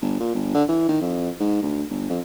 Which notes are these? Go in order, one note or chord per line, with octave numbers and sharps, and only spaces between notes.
G1
A#2
G1
D3
E3
D#3
F2
G#2
D2
G1
F2